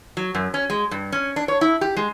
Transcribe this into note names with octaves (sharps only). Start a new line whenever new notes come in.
F#3
F#2
C#4
G#3
G2
C#4
D4
C#5
E4
G4
G#3